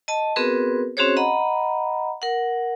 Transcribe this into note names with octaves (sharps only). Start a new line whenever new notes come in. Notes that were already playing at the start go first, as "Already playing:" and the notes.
D#5 A5
B3 C4 F#4 G#4 A#4 B4
C4 C#4 F#4 G#4 C5 C#5
D#5 F#5 A#5 B5
A#4 F#5